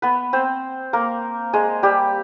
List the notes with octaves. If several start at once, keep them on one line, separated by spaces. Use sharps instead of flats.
B3 B4
C4 C5
A#3 A#4
G#3 G#4
G3 G4